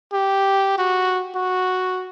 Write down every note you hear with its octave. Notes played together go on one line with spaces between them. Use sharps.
G4
F#4
F#4